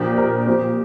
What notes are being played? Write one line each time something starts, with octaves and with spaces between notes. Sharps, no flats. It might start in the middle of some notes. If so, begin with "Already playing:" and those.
Already playing: A#2 F3 D4 G4
A#4
A#2 F3 C4 G4